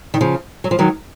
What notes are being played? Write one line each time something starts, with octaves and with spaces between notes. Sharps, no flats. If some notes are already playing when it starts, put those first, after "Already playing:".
D#3
C#3 F3
F#3
F3
D#3 F#3